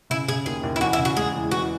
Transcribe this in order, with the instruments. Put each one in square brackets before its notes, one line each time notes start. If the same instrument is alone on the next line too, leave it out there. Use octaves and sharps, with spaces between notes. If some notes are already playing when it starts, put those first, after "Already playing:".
[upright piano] C#3 [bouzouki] E4
[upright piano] C#3 [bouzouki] G#4
[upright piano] D#2 [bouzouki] G#4
[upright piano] D#2
[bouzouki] E4
[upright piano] E2 [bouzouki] F#4
[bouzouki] E4
[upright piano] C#3
[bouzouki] F#4
[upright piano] G#3 [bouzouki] G#4
[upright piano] E2
[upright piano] E3 [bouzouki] F#4